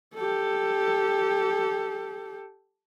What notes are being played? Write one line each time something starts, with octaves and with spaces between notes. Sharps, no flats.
G4 A4